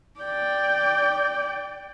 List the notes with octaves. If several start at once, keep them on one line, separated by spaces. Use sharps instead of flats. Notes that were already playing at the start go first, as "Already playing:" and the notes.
D5 G5